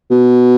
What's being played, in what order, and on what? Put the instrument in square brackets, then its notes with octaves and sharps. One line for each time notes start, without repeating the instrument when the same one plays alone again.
[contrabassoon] B2